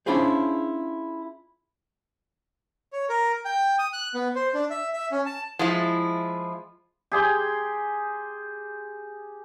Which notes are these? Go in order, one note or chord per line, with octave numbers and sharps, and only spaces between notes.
C#4 D4 E4 F4 G#4 C5
C#5
A#4
G5
D#6
F#6
B3
C5
D4
E5
E5
C#4
A5
F3 G#3 E4
G4 G#4 G5 C6